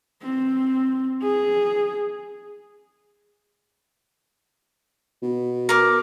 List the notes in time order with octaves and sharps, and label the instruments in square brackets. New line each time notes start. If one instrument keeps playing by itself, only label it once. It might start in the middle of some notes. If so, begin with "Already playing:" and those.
[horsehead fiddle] C4
G#4
[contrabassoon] B2
[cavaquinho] A#4 D6